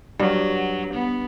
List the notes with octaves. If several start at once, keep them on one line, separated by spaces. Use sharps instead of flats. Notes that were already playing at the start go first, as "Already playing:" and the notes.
G2 F#3
B3